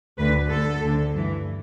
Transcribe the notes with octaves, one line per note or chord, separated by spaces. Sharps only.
D2 D3 B4
D2 D3 A4
D2 D3
G2 E3